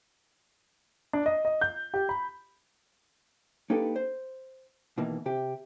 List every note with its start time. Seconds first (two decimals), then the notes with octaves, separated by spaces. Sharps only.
1.13 D4
1.26 D#5
1.45 D#5
1.61 G6
1.94 G4
2.09 B5
3.70 A#3 D4 D#4 G4 A4 B4
3.96 C5
4.98 B2 D#3 E3 A#3
5.26 C3 C4 G4